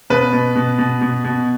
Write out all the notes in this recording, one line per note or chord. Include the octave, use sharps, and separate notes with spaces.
B2 B4
B2
B2
B2
B2
B2